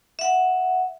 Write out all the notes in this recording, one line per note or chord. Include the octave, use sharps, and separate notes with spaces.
E5 F#5